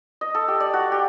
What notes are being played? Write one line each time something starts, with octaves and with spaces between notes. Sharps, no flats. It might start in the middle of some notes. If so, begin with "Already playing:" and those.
D#5
A4
G4
D5
F#4
G4